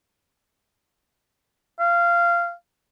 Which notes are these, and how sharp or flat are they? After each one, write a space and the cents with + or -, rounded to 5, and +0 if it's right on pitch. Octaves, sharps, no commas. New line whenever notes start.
F5 -15